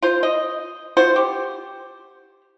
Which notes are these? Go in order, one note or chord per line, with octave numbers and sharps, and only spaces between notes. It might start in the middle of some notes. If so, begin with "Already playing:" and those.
F4 C5
D#5
F4 F#4 C5
G4